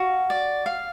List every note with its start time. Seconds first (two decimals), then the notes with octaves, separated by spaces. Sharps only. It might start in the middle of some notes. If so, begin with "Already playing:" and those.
Already playing: F#4 F5
0.30 D5
0.66 F5